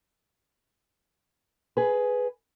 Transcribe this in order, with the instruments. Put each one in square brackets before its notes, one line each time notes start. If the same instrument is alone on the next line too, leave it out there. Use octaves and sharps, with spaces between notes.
[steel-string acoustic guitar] G#4 B4